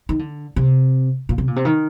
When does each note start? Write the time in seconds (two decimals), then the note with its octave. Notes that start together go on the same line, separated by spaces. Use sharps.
0.09 D#3
0.19 D3
0.56 C3
1.29 A#2
1.38 C3
1.48 A#2
1.56 C3
1.65 D#3